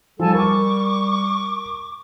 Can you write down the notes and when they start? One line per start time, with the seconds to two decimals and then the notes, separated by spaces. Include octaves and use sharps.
0.20 F3 G3 A4 G#5 A5
0.34 A#4 C#6 D6